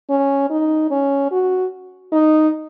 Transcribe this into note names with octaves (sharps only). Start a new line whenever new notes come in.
C#4
D#4
C#4
F#4
D#4